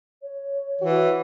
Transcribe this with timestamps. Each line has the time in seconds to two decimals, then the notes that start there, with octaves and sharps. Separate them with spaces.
0.22 C#5
0.82 E3 F#4